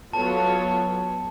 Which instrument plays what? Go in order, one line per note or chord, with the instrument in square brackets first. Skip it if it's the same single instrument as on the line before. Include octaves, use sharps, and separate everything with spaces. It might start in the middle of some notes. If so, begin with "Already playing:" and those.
[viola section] F#3 B3 F4 A4 C#5 [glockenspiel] A5